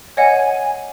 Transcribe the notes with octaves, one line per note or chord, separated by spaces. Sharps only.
C#5 D#5 F#5 G#5